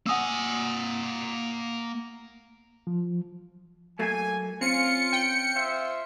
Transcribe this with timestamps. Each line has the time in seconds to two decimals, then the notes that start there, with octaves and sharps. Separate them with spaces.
0.06 A#3 F#5 G#5 D#6 E6
2.87 F3
3.99 F#3 A3 A#3 G#5
4.61 C4 C#4 F4 C#7
5.13 G5
5.55 F4 C5 E5